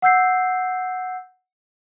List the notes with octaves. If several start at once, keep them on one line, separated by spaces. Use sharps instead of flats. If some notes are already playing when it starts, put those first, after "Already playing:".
F#5 E6 G6 C7